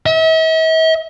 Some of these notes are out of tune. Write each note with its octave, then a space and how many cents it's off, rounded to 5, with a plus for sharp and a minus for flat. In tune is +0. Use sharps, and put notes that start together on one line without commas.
E5 -45